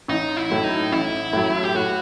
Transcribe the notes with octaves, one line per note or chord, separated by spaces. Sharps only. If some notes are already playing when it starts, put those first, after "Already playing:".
A1 D#4
E4
A2 F#3
D#4
A1 E4
A2 F#3
G4
A2 F#4